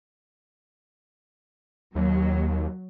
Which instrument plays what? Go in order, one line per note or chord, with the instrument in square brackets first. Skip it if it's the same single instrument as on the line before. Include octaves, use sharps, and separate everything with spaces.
[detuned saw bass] D#2 [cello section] F#3